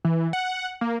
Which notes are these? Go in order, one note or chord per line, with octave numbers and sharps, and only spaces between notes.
E3
F#5
A#3